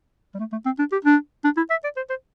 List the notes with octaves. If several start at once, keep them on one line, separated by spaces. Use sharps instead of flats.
G3
A3
A3
C4
D4
G4
D4
D4
E4
E5
D5
C5
C5